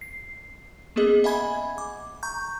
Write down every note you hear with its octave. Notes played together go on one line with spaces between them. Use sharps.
C7
A#3 B3 C#4 G#4 D#5
D#5 E5 F#5 G#5 B5 G#6
D6
A#5 C#6 G6